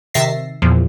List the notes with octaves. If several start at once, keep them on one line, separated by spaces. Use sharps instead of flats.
C3 D#3 E5 A6 A#6 C7
E2 A#2 F3